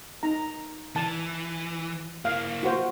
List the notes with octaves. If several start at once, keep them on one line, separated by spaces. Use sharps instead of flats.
D#4 A#5
E3 A5
A#3 E4 F5
F4 F#4 C5